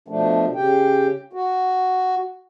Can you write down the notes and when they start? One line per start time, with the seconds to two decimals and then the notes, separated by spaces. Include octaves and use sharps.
0.08 B2 F3 A3 D4
0.55 C#3 G4 G5
1.33 F#4